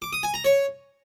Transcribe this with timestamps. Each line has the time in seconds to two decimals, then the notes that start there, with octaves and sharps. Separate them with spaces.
0.02 D6
0.13 D#6
0.23 G#5
0.34 A#5
0.44 C#5